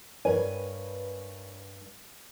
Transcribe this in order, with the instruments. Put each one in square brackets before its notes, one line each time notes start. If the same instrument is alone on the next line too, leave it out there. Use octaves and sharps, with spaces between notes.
[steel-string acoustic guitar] G2 G#5 [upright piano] A#4 B4 C#5